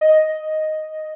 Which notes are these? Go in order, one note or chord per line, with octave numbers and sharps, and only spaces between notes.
D#5